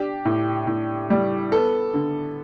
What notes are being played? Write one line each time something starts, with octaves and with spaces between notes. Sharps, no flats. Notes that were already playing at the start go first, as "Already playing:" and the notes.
Already playing: D4 G4
A2
A2
G3
B3 A4
D3